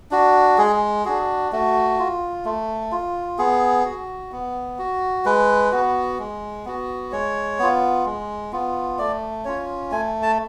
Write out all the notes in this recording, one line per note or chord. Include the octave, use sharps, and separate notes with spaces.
D4 F#4
G#3 G#4
D4 F#4 G#4
A3 F#4
F4
A3
F4
B3 G#4
F#4
B3
F#4
G#3 B4
B3 F#4
G#3
B3 F#4
G#3 C#5
B3 F4
G#3
B3 F4
A3 D5
C#4 F4 C#5
A3 G#5
A5